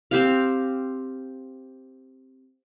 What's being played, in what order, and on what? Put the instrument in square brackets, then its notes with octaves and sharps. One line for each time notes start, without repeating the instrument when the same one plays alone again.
[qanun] C4 G4 F5